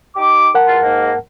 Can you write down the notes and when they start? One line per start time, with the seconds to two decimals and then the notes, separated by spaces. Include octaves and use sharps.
0.16 D#4 G4 D6
0.55 A#4 F#5 A5
0.67 E2 F4
0.82 G#2 A#3